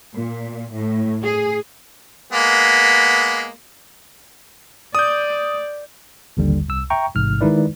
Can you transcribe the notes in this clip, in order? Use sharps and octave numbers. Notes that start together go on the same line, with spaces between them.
A#2
A2
G#4
G#3 A#3 B3
D5 D#6 G6
A1 D#2 D3 G3
C2 E6
E5 G5 A#5 C#6
A1 G#2 C3 F6
D#3 G#3 D#4 E4 B4 D5